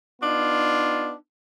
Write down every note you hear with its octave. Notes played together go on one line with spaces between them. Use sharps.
B3 D4 D#4 F4